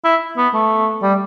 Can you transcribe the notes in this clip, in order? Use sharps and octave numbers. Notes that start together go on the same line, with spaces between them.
E4
B3
A3
G3